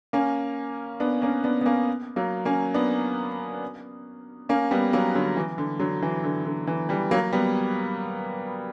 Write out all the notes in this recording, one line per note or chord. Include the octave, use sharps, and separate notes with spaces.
A#3 C#4
B3 D4
A#3 C#4
B3 D4
B3
A#3 C#4
F#3 A#3
A#3 C#4
B3 D4
A#3 C#4
G3 B3
F#3 A#3
D3 F#3
E3
D3
D3 F#3
E3
D3
D3
E3
E3 G3
F#3 A#3
G3 B3